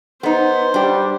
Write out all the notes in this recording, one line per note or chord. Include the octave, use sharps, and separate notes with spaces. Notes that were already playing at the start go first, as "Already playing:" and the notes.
B3 D#4 C5
G3 D4 G4